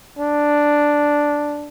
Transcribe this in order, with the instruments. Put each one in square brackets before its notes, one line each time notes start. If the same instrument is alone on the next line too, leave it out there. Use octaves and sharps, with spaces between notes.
[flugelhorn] D4